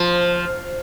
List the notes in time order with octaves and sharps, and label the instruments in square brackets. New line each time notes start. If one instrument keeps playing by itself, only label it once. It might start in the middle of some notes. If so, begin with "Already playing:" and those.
Already playing: [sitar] F3